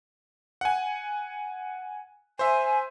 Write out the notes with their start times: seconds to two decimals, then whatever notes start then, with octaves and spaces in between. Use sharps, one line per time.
0.61 F#5 G#5
2.39 C5 E5 G#5